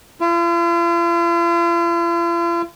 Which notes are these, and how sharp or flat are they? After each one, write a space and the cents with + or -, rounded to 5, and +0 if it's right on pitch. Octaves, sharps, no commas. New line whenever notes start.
F4 -45